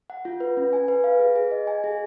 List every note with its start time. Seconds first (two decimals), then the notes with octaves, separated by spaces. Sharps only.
0.10 F#5
0.25 F4
0.40 B4
0.57 C#4
0.73 G#5
0.88 B4
1.04 F5
1.19 G#4
1.36 G#4
1.51 D#5
1.67 G#5
1.84 G#4